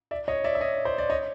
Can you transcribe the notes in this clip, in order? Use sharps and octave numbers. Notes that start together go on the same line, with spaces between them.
D5 E5
C#5 D#5
D5 E5
E5
C#5 D#5
C5 D5
D5
C#5 D#5